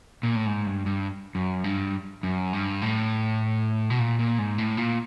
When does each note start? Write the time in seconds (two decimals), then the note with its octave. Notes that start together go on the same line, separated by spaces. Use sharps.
0.23 A#2
0.36 A2
0.46 G#2
0.66 G2
0.86 G2
1.35 F#2
1.64 G2
2.23 F#2
2.53 G2
2.82 A2
3.90 B2
3.99 A#2
4.19 A#2
4.38 G#2
4.58 A2
4.77 A#2